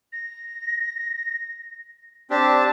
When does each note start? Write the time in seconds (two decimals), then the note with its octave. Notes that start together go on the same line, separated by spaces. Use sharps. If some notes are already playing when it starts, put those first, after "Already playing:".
0.13 A#6
2.30 C4 D4 G4 A5